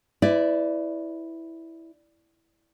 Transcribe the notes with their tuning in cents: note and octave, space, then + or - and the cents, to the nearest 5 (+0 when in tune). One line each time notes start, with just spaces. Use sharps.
E4 -5 B4 +35 D5 +0